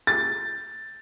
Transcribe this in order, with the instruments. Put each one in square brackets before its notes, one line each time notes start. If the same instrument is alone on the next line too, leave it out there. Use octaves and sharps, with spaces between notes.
[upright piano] A6